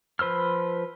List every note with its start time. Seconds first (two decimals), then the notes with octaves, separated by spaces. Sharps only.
0.19 F3 B4 C5 E6 F6